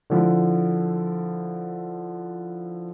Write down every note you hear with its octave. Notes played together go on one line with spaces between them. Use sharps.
D3 F3 E4